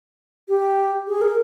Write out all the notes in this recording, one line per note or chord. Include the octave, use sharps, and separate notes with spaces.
G4
G#4
A#4